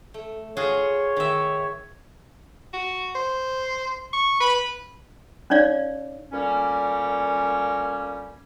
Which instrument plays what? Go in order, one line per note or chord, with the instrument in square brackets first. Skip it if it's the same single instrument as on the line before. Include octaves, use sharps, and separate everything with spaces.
[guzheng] A3
[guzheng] F4 F#4 G#4 [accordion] C#5
[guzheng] D#3 E5
[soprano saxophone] F#4
C5
C#6
[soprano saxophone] B4 [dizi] B5
[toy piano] C#4 D#4 C#5 D5 F5
[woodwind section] D2 A#2 G3 A#3 C#4